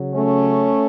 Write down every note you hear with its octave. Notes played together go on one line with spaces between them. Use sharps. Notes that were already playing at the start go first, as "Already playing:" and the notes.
Already playing: C#3 F#3
A3 C#4